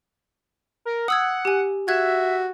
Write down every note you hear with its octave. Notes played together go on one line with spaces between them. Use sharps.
A#4
F#5 D#6 E6 G#6
G4 G#5
F#4 E5 F#6 G#6